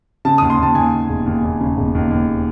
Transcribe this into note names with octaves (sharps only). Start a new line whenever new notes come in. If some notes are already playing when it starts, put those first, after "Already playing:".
C#3 A5
D#2 D#6
C6
D#2 A5
D#2 G#5
D#2
E1
D#2
D#2
C#3
E1
D#2
D#2